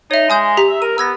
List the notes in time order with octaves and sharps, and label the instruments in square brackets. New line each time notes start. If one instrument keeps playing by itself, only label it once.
[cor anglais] D#4 [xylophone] C#5 E5
[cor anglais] G#3 [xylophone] G#5 D#6 G6
[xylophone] G4 A#5 B6
[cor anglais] E5
[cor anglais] A#4 [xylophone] D#7
[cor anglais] B3 [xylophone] E6 G#6 A#6